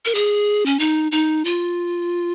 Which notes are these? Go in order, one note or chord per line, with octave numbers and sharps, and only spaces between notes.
A#4
G#4
C#4
D#4
D#4
F4